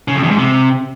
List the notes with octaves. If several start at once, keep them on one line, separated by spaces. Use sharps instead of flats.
C#3
F2
E2
G#2
C3